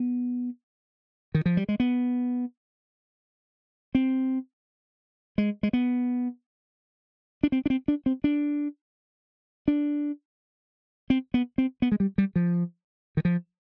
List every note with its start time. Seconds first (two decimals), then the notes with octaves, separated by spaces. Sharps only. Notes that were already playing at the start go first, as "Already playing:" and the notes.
Already playing: B3
1.35 D#3
1.46 F3
1.57 G3
1.69 G#3
1.80 B3
3.95 C4
5.38 G#3
5.63 G#3
5.73 B3
7.43 D4
7.52 C4
7.66 D4
7.70 C4
7.88 D4
8.06 C4
8.24 D4
9.68 D4
11.10 C4
11.34 B3
11.58 C4
11.82 B3
11.92 G#3
12.00 G3
12.18 G3
12.36 F3
13.17 D#3
13.25 F3